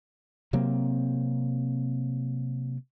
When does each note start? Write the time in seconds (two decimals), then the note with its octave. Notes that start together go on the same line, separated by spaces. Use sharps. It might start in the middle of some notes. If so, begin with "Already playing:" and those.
0.53 C3 F#3 A#3 C4